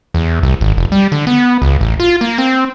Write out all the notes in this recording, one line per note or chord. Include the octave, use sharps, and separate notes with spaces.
E2
C2
G#1
F1
G3
D3
B3
C#2
A1
F4
A#3
C4